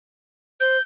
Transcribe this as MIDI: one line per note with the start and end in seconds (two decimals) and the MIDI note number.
0.60 0.77 72
0.60 0.82 91